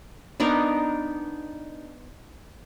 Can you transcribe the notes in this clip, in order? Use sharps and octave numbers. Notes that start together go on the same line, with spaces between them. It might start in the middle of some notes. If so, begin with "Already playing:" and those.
B3 D4 D#4 A#4